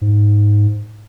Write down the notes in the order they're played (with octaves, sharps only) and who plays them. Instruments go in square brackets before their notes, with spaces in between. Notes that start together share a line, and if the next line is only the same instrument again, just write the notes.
[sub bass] G#2